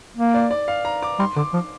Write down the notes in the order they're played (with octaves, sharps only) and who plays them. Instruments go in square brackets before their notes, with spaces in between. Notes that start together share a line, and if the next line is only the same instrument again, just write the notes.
[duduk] A#3
[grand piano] D5
D5
F5
A#5
D6
[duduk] G3 [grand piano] C6
[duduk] D3 [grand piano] D6
[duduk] F3